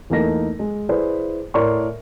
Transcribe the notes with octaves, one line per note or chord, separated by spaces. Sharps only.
E2 A3 A#3 D#4 A#6
G#3
E4 G#4 B4 C5 D5
A2 A#4 C#5 D5 C6 C#6